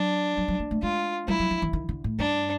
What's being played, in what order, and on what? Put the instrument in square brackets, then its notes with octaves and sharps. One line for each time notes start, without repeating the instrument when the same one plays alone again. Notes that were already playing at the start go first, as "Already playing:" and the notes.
Already playing: [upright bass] F#3 [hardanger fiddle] D4
[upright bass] F#3
F#3
A#3
A3
[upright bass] G#3 [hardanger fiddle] F4
[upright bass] G3 [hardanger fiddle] E4
[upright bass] F#3
F3
E3
D#3
D3
A2
[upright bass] G2 [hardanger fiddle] D4